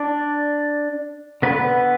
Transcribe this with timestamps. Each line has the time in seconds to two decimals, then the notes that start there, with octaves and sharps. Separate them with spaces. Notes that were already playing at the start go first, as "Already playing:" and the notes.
Already playing: D4 D5
1.42 D3 B3 B4